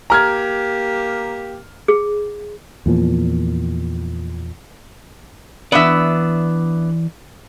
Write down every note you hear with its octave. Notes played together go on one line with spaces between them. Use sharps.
A#3 G4 A#5 F6 G#6
G#4
E2 A#2 F3
E3 B3 D4 D5 E5